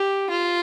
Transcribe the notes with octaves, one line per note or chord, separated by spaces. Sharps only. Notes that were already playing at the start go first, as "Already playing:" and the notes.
Already playing: G4
F4